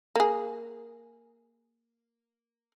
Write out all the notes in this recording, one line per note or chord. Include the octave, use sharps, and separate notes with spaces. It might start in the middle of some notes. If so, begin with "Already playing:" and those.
A#3 G#4